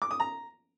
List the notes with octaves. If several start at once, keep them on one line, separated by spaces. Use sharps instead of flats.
D6
D#6
A#5